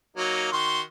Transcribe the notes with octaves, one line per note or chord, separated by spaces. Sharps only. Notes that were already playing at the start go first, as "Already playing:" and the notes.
F#3 A#3 D#4
D#3 F#4 C6